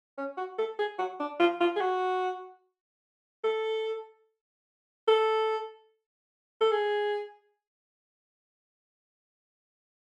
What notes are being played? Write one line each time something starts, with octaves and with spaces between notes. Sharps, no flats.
C#4
F#4
A4
G#4
F#4
D4
F4
F4
G#4
F#4
A4
A4
A4
G#4